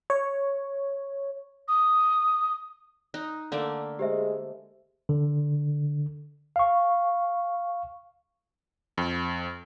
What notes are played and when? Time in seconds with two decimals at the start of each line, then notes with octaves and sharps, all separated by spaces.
0.10 C#5
1.68 D#6
3.14 D#4 F#6
3.52 D3 A3 A#3
3.99 G#3 G4 C5 E5
5.09 D3
6.56 F5 C#6
8.98 F2